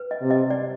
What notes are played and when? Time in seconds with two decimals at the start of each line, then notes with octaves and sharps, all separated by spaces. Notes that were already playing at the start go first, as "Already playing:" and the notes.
Already playing: B4
0.11 D#5
0.21 C3
0.31 D#5
0.50 D5